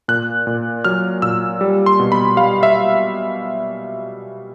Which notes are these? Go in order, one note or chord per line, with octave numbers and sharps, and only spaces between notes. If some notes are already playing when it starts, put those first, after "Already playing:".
A#2 F#6
A#2
F#3 F6
A#2 E6
G3
C6
B2
B5
G3 F5
E5